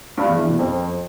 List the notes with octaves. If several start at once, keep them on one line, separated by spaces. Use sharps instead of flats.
G2
E2
E3
B2
F2